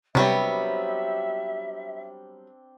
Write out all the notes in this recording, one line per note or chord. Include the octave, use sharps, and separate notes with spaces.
C3 F#3 G3 B3 C4 D4 E5 E6